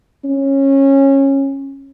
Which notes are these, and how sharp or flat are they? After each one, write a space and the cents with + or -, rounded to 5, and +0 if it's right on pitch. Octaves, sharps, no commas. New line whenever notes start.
C#4 -20